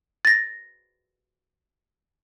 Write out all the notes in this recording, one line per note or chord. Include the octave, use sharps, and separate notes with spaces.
A6 A#6